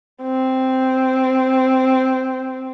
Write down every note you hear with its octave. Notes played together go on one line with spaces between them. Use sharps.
C4